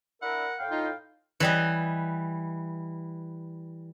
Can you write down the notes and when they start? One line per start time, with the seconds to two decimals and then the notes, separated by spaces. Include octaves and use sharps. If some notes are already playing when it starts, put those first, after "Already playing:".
0.22 D4 E4 A#4 E5 F#5
0.59 A2 F5 G5
0.71 D#4 F4
1.40 E3 G3 D#5